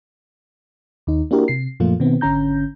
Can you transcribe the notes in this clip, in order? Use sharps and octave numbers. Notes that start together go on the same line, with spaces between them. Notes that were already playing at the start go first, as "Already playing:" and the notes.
D#2 D#4
A#3 D4 E4 F#4 G4 A#4
C3 C7
F#2 A#2 F3 A3 A#3 F4
B2 D#3 B3 C4
G#1 D3 C#4 A#5 G6